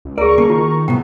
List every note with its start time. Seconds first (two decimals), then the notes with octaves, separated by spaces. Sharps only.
0.05 C#2
0.18 D2 G#4 A#4 D5 A#5 C#6
0.38 C#3 A#3 A5
0.50 D#3 F4
0.88 A2 C3 B3 G5